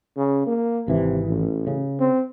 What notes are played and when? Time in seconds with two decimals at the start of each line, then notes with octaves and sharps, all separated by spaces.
0.16 C#3
0.46 A#3
0.88 G#1 C3 E3
1.29 A1
1.67 C#3
2.00 C4